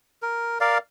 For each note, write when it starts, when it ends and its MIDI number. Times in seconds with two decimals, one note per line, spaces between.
0.22 0.58 70
0.61 0.78 70
0.61 0.78 74
0.61 0.78 77